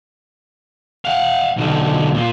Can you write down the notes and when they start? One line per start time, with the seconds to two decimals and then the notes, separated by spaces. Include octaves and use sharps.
1.05 F5 F#5
1.57 B1 D3
2.14 A#2 F4